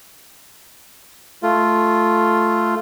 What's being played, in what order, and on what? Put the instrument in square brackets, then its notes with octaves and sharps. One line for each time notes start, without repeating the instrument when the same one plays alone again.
[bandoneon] A3 F4